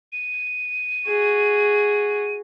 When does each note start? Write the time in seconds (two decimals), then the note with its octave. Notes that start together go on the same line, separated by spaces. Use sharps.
0.12 D#7
1.08 F#4 G#4